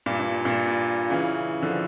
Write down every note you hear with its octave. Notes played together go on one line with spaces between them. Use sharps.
G2 A#2
G2
G2 A#2
C#3 E3
D3 F3